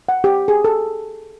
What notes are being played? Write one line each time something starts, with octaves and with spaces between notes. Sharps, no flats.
F#5
G4
G#4
A4